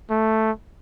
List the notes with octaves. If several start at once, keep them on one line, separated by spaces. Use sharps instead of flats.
A3